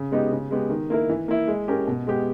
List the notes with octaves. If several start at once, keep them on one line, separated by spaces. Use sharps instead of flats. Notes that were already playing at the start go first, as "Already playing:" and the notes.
Already playing: C#3
G#3 B3 D#4 G4
C#3
G#3 B3 G4
D#3
A#3 E4 A#4
E3
A#3 E4
G#3
C#4 G4 A#4
B2
G#3 B3 G4